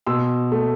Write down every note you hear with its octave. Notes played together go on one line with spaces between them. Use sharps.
B2 C6 E6
A3